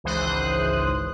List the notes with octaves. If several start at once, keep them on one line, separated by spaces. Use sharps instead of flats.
G#1 C#2 E3 C5 D#6 F#6